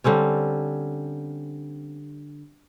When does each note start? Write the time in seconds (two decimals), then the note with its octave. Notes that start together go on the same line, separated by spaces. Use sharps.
0.04 D3 G3 C4 C#4